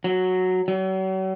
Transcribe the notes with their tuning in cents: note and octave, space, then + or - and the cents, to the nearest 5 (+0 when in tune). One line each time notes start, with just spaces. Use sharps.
F#3 -5
F#3 +40